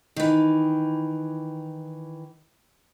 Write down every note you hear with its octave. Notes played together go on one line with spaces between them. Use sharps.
D#3 E3